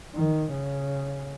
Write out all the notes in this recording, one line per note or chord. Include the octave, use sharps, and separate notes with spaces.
D#3
C#3